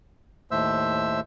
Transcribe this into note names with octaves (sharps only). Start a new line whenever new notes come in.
D#2 A2 C5 E5 E6